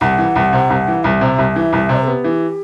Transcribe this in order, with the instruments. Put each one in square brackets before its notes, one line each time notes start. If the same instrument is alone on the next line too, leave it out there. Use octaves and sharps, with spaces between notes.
[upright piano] C2 [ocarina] F#5
[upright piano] E3
C2
C3
C2
E3
[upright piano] C2 [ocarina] E5
[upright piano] C3
C2
E3
C2
C3
[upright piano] B3 [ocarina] G4
[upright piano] E3